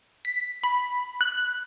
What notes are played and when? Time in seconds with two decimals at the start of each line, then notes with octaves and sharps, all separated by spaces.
0.25 B6
0.63 B5
1.21 F#6